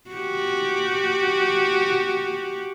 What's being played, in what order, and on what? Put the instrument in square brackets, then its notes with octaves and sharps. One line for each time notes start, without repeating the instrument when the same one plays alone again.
[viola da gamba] F#4 G4